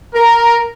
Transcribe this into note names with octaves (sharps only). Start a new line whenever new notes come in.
A#4